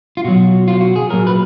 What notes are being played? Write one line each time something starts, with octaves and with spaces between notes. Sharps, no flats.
F4
B2 F#3 F#4
F4
F#4
G#4
A#2 F#3 A#4
B4